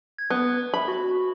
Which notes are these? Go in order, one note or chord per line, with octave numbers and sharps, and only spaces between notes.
G#6
B3
E5 B5
F#4